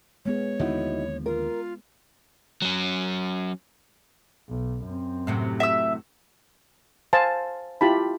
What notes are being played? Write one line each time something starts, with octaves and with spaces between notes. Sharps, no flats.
G#3 B3 G#4 C#5
D#2 D3 F3 D#4 E4 F#4
F4 A#4
F#3 C#4
B1
F#2 C4
A2 C3 F#3
E5 E6
C5 F5 G#5 A5
E4 F4 G4 A5 B5